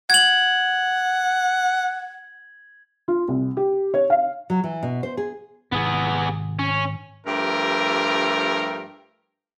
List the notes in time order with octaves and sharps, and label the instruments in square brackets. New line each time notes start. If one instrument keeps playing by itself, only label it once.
[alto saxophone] F#5 [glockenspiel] G#6 F#7
[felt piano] F4
C2
G4
C#5
F5
[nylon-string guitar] F#3
E3
B2
C5
G#4
[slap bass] G#1 C3 [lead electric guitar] B3 G#4
[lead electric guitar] C#4
[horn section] G2 F3 A3 G4 A#4